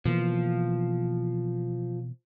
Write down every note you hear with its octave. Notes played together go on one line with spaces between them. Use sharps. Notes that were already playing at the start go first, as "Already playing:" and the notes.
B2 E3 F3 A#3